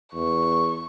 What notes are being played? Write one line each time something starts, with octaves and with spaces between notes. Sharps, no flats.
E2 C#6